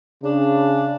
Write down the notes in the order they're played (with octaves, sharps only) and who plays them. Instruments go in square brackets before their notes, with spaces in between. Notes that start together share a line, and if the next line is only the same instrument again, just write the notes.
[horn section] C#3 D4